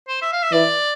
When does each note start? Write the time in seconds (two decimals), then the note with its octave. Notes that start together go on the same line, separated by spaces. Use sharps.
0.08 C5
0.22 E5
0.33 F5
0.43 E5
0.53 E3 D5